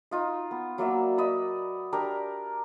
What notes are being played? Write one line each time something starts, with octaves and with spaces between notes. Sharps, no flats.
D#4 F4 D#5
B3
F#3 A#3 D5 E5
B4 D5 D#5 E6
D4 G4 A#4 A#5